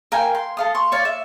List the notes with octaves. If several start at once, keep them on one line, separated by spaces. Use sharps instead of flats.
A#4 F5 G5 G#5
C6
A4 F5 D#6
C6 C#6
C#5 D5 F5
E5